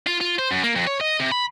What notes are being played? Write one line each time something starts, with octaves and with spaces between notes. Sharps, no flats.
F4
F4
C5
F#2
A#3
F2
C#5
D#5
C3
B5